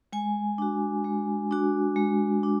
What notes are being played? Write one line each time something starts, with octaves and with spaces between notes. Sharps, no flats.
G#3 G#5
D4 F#4
G#3
D4 F#4
G#3
D4